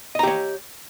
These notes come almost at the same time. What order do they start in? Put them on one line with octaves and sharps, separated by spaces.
D#5 A#5 G4 C#5